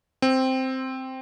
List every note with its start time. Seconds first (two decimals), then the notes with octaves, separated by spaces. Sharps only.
0.22 C4